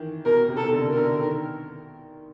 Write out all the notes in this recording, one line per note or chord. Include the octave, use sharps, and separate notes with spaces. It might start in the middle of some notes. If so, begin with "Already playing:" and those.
Already playing: D#3 E3
B2 A#4
C3
B2 A4
C3
D3
A#4
D3
D#3